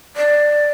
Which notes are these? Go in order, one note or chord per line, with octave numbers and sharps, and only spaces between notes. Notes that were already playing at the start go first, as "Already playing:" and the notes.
D5